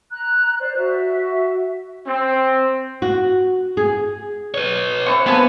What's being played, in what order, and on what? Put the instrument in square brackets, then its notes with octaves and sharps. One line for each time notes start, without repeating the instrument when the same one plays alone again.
[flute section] A#5 F#6
C5 D5
F#4 E5
[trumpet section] C4
[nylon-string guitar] F#4
G#4
[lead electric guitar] B4 C#5
[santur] C4 D4 E4 [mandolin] C#6
[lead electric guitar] B3 [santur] F4 A#4 [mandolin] B4 G#5 A5